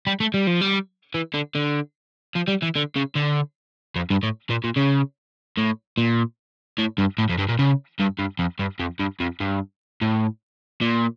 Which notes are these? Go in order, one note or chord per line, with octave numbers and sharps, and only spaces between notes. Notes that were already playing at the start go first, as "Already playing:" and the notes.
G3
A3
G3
F3
G3
E3
D3
D3
F3
G3
E3
D3
C#3
D3
F2
G2
A2
A#2
A#2
C#3
A2
A#2
A2
G2
A2
F2
G2
A#2
C#3
G2
G2
F2
G2
F2
G2
F2
G2
A2
A#2